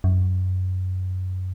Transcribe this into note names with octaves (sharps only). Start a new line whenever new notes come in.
F#2